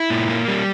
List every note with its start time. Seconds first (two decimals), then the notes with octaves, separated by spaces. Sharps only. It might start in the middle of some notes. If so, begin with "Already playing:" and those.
Already playing: E4
0.10 A#2
0.29 A#3
0.48 G3